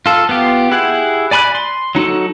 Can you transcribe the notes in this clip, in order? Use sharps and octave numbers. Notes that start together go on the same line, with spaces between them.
F4 A4
B3 F4 G4
E4 G4 G#4 F#5
D5 G#5 B5 C#6 F#6
C6
F#3 D#4 F#4 A4